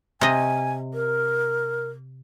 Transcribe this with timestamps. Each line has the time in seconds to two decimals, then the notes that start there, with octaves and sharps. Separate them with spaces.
0.21 C3 D#5 G#5
0.94 A#4